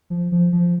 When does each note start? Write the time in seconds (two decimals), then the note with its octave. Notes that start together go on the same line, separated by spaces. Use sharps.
0.10 F3
0.32 F3
0.52 F3